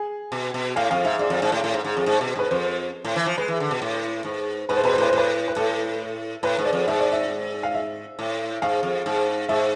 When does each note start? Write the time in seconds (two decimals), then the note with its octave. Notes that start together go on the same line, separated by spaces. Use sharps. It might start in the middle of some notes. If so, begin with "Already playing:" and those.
Already playing: G#4
0.32 B2
0.54 B2
0.76 A2 F5
0.91 F2 F5
1.05 G#2 E5
1.19 G#2 D5
1.30 F2
1.42 G#2
1.52 A2
1.64 A2
1.74 G#2
1.85 G#2
1.97 F2
2.06 G#2
2.21 B2
2.36 G#2 B4
2.51 F2 C5
3.05 A2
3.16 E3
3.26 F3
3.38 G#3 B4
3.48 E3
3.60 D3
3.71 B2
3.82 A2
4.25 G#2
4.69 G#2 B4
4.77 C5
4.84 B2 B4
4.93 C5
4.98 A2 B4
5.10 A2 C5
5.18 B4
5.48 B4
5.56 A2 A4
6.43 A2 B4
6.59 G#2
6.65 D5
6.73 F2
6.87 G#2 E5
7.00 D5
7.12 E5
7.63 F5
7.74 E5
8.19 A2
8.62 G#2 F5
8.83 F2
9.06 G#2
9.49 G#2 E5